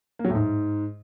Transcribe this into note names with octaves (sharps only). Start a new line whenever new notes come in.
A#3
F#3
A2
G#2